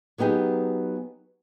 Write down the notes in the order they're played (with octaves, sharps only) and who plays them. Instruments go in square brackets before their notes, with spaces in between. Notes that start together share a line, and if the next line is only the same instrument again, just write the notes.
[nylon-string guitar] F#3 B3 D#4 G4 G#4